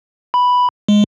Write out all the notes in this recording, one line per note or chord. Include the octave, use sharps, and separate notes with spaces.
B5
G#3